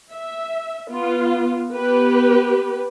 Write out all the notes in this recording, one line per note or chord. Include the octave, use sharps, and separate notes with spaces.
E5
B3 F4
B3 G4 B4